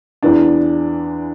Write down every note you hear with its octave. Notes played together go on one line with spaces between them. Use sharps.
E2 E3 D4